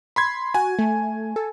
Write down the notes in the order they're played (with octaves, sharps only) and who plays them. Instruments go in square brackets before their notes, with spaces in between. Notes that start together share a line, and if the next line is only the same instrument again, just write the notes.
[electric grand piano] B5 C6 G#6
[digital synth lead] F#4 [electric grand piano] G#5
[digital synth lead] A3
A4